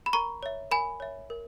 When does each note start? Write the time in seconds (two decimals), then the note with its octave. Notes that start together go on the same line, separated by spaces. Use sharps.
0.06 B5
0.13 A#4 A#5 C#6
0.43 C#5 E5
0.71 A#4 G#5 B5
1.00 C#5 E5
1.30 A#4